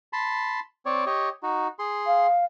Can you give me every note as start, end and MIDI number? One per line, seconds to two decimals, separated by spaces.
0.13 0.60 81
0.13 0.60 83
0.13 0.60 84
0.86 1.05 60
0.86 1.05 73
0.86 1.05 74
1.06 1.29 67
1.06 1.29 73
1.06 1.29 75
1.43 1.68 63
1.43 1.68 66
1.79 2.27 68
1.79 2.27 84
2.06 2.45 77